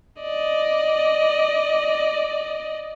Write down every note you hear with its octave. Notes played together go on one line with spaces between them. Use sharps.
D5 D#5